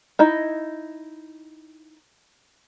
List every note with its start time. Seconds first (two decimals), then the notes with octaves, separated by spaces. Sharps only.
0.19 D#4 E4 D#5